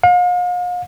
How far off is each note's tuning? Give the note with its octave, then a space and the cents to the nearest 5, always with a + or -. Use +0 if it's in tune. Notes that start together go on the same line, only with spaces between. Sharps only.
F5 +40